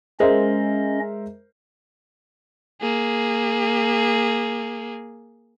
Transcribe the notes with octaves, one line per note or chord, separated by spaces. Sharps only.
G#3 C#4 A#4 C5 D#5 E5
A#3 G#4